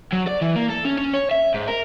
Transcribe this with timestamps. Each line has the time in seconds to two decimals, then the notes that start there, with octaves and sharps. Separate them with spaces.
0.13 F#3
0.28 D5
0.42 E3
0.56 A#3
0.70 A4
0.85 C#4
0.98 C#4
1.14 C#5
1.31 E5
1.54 G#2
1.68 A#4